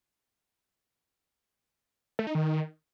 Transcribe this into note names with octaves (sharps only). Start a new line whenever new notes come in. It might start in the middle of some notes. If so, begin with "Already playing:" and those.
A3
D#4
D#3